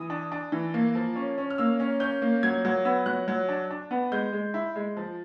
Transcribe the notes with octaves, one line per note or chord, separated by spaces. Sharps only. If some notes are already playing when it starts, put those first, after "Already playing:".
Already playing: E3 D#6
D4
D4
E3
A#3
F3
C#4
C#4
F6
A#3 E6
C#4
C#4 G6
A#3
F#3 G#6
F#3
B3 E6
F#3 F#6
F#3
D4
D4
B3
G#3 G6
G#3
E4
G#3
F3